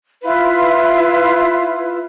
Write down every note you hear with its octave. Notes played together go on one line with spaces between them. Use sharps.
E4 F4 B4 E5